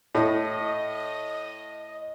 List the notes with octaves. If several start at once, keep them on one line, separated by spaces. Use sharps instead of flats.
A2 D#5